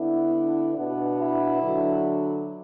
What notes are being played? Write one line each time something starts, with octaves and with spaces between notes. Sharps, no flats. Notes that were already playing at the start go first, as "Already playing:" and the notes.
Already playing: D3 B3 D4 E4
B2 B3 D4
E4
D3 F#3 D4